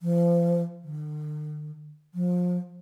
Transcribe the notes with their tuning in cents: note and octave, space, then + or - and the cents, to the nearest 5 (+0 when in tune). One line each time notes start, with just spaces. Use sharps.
F3 -30
D3 +45
F3 +30